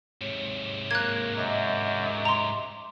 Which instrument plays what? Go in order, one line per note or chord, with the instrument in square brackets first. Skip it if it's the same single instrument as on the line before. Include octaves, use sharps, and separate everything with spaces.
[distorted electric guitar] G#2 C3 [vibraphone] C#5
[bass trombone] A#3 [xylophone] F#6 G#6
[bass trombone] F#2 [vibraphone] D#5 E5 D6
[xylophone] A#5 C6